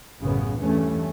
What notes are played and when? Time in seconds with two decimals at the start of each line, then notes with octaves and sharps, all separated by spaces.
0.19 A1 F#2 C#3 B3
0.57 E2 G2 E3 A3 C#4